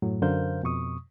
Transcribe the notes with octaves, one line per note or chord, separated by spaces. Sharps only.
F#2 A2 F#3
F#2 D3 A#4 C5 F5 G6
F2 B2 C#6 D#6